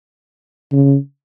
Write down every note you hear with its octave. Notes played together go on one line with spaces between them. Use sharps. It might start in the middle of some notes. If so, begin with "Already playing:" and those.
C#3